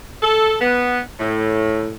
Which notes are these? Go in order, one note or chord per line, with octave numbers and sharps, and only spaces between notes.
A4
B3
A2